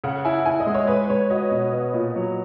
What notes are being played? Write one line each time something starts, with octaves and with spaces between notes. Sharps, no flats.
C#3 F#5
E4 G#5
E4 G#5
D#5
G#3
C#5
G#3 B4
G#3 C#5
F#4 D#5
B2
B3
A#2
F#3